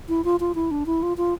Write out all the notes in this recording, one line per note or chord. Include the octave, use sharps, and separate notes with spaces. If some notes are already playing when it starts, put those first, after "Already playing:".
E4
F4
F4
E4
D4
E4
F4
F4